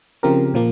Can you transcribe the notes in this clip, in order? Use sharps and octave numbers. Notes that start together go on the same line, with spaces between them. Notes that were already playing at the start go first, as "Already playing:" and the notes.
C#3 F3 C4 G4 A#4
A#2 F3 A#3